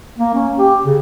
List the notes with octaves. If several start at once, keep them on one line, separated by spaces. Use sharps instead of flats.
A#3
C#4
G4
C#3